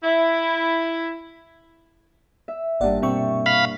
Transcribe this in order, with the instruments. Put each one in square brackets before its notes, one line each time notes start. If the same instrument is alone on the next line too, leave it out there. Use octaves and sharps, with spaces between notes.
[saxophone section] E4
[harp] E5
[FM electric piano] G#1 D5 F#5 [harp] G2 A#2
[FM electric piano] B2 C4 C#6 [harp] E5 G5
[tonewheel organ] F5 B5